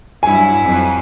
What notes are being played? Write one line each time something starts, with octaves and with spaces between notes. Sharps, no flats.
G2 F#3 E4 G#5
F2 F#3